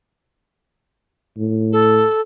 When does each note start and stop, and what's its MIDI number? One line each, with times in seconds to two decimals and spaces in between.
1.38 2.04 45
1.72 2.21 69